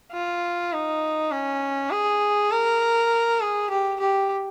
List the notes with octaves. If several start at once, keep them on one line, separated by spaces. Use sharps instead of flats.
F4
D#4
C#4
G#4
A#4
G#4
G4
G4